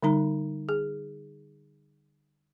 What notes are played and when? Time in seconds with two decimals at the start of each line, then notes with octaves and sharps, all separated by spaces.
0.03 D3 G3 D#4 A#5
0.69 G#4